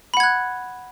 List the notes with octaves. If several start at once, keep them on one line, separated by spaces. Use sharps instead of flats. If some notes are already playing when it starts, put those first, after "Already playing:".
F#5 B5 F#6 G#6